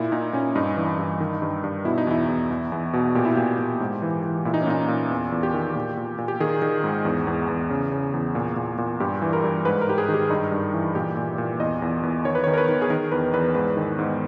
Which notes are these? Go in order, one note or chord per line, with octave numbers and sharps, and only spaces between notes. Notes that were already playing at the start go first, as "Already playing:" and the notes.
Already playing: A#2 E4
A#2 D#4
A#2 C#4
G2 D#4
E3
G2
D#3
G2
G2
B2 E4
D#4
E2 E4
E2
E2
E2
B2
A#2 G4
E4
A#2 G4
A#2
G#2
E3
E3
A#2 E4
D#4
C#4
A#2 D#4
A#2
E2
E2
G4
D#3
A#2
A#2
A#2
G4
D#3 G#4
D#3
G#2
E2
E2
E2
C#3
C#3
E2
A#2
A#2
A#2
G2 G4
E3
A#4
G2
G#2 B4
A#4
G#2 G4
G#4
D#3
G4
G2 D#4
G2
E3
A#2 G4
A#2
A#2
E2 D#5
E2
E2
D#3 C#5
B4
D#3 C#5
A#4
B4
D#3
G#4
D#3 A#4
E2 B4
E2 B4
G#2 B4
D#3
G#2